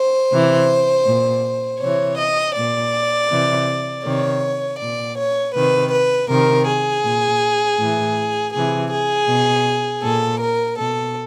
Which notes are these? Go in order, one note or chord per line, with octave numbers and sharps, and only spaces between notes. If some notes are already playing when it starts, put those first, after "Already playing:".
Already playing: C5
C3 E3
A#2
C3 E3 C#5
D#5
A#2 D5
C3 E3
C3 D#3 C#5
A#2 D5
C#5
C3 D#3 B4
B4
C3 D#3 A#4
G#4
A#2
A2 E3
C3 E3 G#4
G#4
B2
A#2 A4
A#4
B2 A4